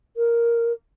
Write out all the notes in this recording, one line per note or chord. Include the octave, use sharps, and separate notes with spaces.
A#4